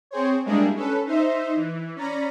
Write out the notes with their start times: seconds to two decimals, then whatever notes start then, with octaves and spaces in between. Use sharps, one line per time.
0.11 C4 G#4 C5 C#5
0.46 G3 G#3 A#3 D4 E4 G#4
0.74 C#4 A4 B4
1.06 D#4 C5 E5
1.56 E3
1.96 C#4 D5 A#5 B5